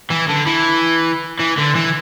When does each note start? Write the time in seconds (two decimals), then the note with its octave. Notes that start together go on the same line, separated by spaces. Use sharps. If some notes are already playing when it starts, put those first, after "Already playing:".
0.10 E3
0.29 D3
0.46 E3
1.39 E3
1.58 D3
1.75 E3